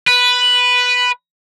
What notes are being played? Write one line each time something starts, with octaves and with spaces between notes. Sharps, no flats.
B4